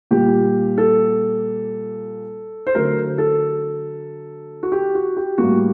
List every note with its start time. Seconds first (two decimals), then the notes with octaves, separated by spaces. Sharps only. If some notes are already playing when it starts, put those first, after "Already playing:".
0.11 A#2 G3 A#3 G4
0.78 A4
2.67 C5
2.75 D3 F#3 A3 A#4
3.18 A4
4.63 F#4
4.72 G4
4.95 F#4
5.17 G4
5.38 A2 G3 A#3 F#4